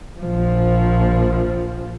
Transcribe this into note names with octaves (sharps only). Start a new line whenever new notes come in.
A#1 F3